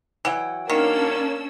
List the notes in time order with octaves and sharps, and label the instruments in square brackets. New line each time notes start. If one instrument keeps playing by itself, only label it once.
[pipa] E3 [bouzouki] F#3 F#5 G5
[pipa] D#3 [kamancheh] A#3 [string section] C#4 D4 E6